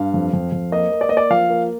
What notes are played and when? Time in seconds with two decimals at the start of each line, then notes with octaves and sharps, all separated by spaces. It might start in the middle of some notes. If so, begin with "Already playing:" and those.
Already playing: G2 F5
0.14 F2
0.33 F2
0.52 F2
0.72 A#3 D#5
0.91 A#3
1.01 D5
1.09 A#3 D#5
1.17 D5
1.30 F3 F5
1.50 A#3